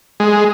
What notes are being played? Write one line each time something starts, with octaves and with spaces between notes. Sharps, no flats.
G#3